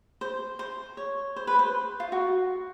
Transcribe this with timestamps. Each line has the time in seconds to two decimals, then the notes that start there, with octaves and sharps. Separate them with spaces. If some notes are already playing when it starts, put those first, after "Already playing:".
0.21 C5
0.59 C5
0.97 C#5
1.36 C5
1.47 B4
1.59 C5
2.00 F4
2.12 F#4